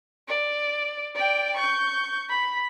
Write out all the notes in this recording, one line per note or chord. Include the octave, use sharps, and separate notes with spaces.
D5
D5 G5
C#6 G6
B5